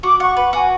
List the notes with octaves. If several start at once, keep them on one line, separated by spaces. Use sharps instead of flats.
F#4 D6
F#5 C#6
B4 B5
F#4 G#5